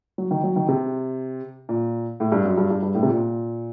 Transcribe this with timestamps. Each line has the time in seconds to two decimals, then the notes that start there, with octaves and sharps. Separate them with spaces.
0.18 F#3
0.31 D#3
0.44 F#3
0.56 D#3
0.68 C3
1.69 A#2
2.20 A2
2.32 G2
2.45 F#2
2.58 G2
2.70 G2
2.83 G2
2.95 A2
3.03 C3
3.08 A#2